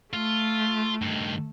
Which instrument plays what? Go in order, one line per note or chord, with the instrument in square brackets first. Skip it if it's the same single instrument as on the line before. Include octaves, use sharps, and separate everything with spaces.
[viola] A3 [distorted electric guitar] F4
[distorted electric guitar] G2 D#3